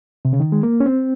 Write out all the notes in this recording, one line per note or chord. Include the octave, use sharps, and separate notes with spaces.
C3
C#3
D#3
G#3
A#3
C#4
C4